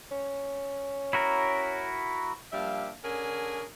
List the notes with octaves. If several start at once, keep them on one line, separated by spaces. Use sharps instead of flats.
C#4
E4 F#4 A#4
F3 G3 A#3 D4 E5 F5
D3 C#4 D4 G#4 A#4